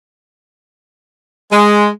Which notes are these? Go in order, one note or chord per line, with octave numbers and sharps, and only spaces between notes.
G#3